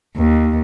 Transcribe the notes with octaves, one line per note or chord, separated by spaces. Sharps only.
D#2